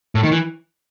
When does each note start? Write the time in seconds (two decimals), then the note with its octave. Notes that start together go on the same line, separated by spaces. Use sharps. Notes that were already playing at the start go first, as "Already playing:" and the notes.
0.15 A2
0.23 D#3
0.32 E3